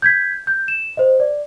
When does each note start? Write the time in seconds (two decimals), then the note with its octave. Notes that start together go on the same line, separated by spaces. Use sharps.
0.02 G6 G#6 B6
0.47 G6
0.68 E7
0.97 C5 D#5
1.20 D5